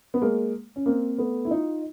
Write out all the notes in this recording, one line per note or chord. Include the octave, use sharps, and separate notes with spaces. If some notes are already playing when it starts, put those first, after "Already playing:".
B3
G#3 A#3
C#4
A#3 C4
A3 B3
E4
D#4 F4